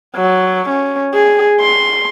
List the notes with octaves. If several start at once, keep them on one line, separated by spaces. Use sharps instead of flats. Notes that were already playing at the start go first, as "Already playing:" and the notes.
F#3
C#4
G#4
C6